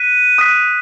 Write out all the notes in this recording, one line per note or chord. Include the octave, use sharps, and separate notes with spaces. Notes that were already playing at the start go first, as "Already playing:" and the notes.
Already playing: F#6 B6 D#7
D#6 F#6 B6 D#7